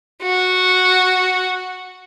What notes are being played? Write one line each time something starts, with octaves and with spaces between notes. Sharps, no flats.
F#4